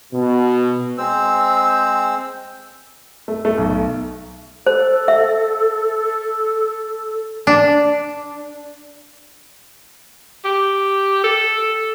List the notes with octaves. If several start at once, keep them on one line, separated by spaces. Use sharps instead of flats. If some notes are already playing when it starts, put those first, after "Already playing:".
B2
G#3 C4 C5 E6
A3
A3
B1
A4 C5
E5
D4
G4
A4